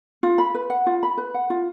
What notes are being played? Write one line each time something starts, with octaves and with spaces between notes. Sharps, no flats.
F4
B5
B4
F#5
F4
B5
B4
F#5
F4